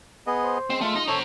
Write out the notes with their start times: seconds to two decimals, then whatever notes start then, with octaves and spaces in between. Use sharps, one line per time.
0.27 B3 G#4 D#5
0.43 C5
0.70 G#3 C4
0.81 A3 F4
0.95 D#4 D#5
1.08 A4 C5 C#5 A#5